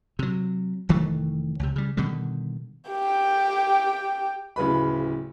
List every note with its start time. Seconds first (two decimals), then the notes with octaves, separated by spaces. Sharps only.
0.19 C3 F#3
0.89 F1 D#3 E3 A3
1.60 C#2 C3
1.76 C#3 G3
1.97 B2 D3 D#3 G3
2.89 G4 G5
4.56 D1 C#3 B4 B5